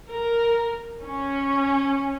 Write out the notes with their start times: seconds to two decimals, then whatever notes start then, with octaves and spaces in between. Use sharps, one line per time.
0.11 A#4
1.05 C#4